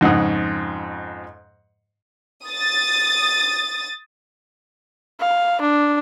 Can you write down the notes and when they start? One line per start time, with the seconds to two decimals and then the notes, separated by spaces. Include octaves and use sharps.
0.01 F2 G#2 C#3 F#5 D#6
2.46 D#6 A6
5.20 F5
5.60 D4